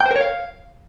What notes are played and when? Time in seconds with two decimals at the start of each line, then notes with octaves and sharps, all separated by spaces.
0.01 G5
0.06 C5
0.11 A#4
0.16 C#5
0.21 F5